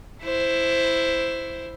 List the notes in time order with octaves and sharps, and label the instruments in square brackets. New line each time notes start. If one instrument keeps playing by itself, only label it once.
[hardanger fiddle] E4 C5